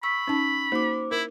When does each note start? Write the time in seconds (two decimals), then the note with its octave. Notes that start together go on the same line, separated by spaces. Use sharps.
0.03 B5 C#6 E6 B6
0.27 C#4 D#4 A5
0.72 A#3 D#4 F#4 C5 D6
1.11 E4 A#4